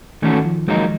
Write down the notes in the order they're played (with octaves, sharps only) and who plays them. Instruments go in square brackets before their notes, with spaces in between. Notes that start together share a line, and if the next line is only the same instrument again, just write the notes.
[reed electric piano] D#3 [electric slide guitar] E3 A3 C#4 F#4 A4
[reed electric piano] F3
[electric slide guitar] D#3 F#3 A#3 D#4 [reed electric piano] G#3